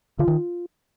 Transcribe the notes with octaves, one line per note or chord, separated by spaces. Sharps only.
D3 F4
D#3